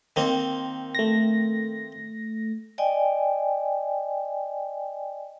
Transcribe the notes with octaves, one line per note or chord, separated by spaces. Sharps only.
D#3 A#3 C4
A3 A#6
D5 D#5 G5 G#5